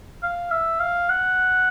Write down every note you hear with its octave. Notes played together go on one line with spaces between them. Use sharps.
F5
E5
F5
F#5